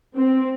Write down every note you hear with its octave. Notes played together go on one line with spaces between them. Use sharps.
C4